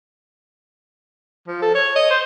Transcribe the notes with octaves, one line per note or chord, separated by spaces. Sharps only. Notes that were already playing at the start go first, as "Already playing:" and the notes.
F3
A4
C#5
D#5
C5